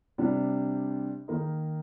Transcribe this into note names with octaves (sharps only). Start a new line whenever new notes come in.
C3 G3 D4
D#3 A#3 D#4